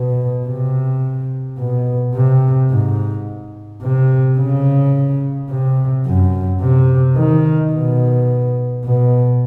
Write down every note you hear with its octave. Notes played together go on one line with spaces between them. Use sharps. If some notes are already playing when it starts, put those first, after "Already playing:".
Already playing: B2
C3
B2
C3
G#2
C3
C#3
C3
F#2
C3
D#3
B2
B2